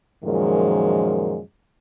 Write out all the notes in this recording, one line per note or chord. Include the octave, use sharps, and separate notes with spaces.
F#2 A#2 D#3 F3 G#3